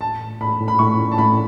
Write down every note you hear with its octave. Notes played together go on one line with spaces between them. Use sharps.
A2 A5
A2
A2 B5
A2
B5
A2 C#6
C#4
A5
A2 B5